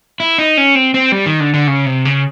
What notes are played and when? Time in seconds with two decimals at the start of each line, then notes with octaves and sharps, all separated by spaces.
0.20 E4
0.38 D#4
0.57 C#4
0.75 C4
0.94 C4
1.12 G3
1.26 D#3
1.40 D3
1.54 D3
1.67 C#3
1.86 C3
2.05 C#3